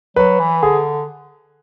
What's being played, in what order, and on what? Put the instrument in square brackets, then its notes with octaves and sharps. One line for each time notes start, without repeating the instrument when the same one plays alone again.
[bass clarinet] F#3 [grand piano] B4
[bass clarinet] E3
[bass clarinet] D3 [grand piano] G#4